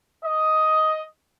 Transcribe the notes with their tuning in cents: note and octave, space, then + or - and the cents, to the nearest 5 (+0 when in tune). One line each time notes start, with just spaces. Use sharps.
D#5 +10